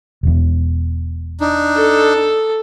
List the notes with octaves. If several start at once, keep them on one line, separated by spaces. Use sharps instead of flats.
E1 E2
D4 D#4
A4